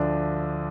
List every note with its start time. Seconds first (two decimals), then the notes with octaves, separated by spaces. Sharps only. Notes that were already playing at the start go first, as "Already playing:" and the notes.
Already playing: D2 D3 F3 D4